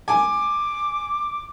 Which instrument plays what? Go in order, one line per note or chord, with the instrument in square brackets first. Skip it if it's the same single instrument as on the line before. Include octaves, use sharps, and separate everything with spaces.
[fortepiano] G#5 [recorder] D6